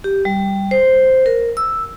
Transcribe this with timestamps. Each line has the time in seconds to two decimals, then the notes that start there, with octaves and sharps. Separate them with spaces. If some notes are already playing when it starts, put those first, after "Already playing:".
0.04 G4
0.25 G3
0.71 C5
1.26 A#4
1.57 E6